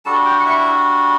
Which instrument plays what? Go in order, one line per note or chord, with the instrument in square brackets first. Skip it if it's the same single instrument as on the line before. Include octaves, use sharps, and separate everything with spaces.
[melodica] G3 D4 F#4 A4 A5
G4 G5
F#5
E4 E5